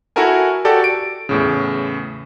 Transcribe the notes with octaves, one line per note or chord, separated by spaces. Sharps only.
E4 F#4 A4 A#4 G#5
F#4 G4 A4 D5
D7
E2 A2 C#3